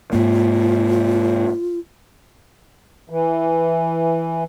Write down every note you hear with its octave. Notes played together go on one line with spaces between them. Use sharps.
G#2 A#3 F4
E3